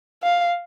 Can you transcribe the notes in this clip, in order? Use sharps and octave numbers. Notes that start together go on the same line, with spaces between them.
F5